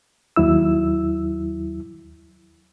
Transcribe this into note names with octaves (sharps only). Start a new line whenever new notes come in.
D#2 F#3 E4 E6